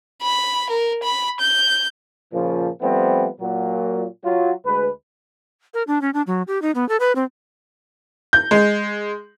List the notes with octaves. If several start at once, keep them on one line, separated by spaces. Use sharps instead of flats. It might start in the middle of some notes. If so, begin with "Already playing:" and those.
B5
A#4
B5
G6
A#2 C#3 F3
F3 G3 A3 B3 C4
A#2 F#3
F#3 F4
D2 G#3 B4
A#4
D4
C#4
D4
F#3
G4
D#4
B3
A4
B4
C4
G6
G#3